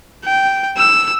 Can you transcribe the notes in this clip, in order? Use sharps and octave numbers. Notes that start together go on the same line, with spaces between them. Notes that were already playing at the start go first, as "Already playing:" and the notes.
G5
E6